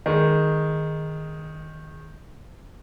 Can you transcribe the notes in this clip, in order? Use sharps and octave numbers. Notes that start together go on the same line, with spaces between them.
D#3 G#3